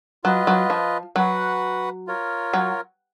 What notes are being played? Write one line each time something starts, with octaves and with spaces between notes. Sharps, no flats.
F#3 F4 B4 D#5
F#3
F3
F#3 F#4 B4 F#5
F4 A#4 C#5
F#3